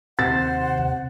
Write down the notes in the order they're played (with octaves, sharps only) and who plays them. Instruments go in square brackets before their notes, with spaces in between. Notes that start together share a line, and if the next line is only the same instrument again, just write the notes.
[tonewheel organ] D#2 C5 [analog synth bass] C3 [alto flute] F#5 [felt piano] A6